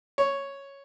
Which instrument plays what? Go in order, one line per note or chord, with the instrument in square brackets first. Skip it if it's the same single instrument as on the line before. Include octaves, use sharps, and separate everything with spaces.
[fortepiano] C#5